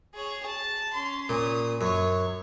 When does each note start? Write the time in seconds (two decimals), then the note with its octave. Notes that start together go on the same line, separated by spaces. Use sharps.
0.14 G#4 C#5
0.46 A5
0.93 C#4 C6
1.29 A#2 C#4 D#6
1.81 F#2 C#5 C#6